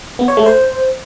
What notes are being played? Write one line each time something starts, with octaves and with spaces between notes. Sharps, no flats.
B3
C#5
A3
C5